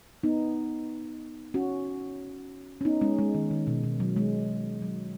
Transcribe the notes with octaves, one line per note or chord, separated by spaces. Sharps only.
B3 D#4
C#4 F#4
C#4
B3 D#4
G#3 C#4
G#3
D#3
D#3
B2
B2
F#3
G#3
F#3